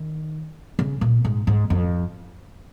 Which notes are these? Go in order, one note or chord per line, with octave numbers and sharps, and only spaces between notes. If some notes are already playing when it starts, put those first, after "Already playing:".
Already playing: D#3
C#3
A#2
G#2
G#2
F2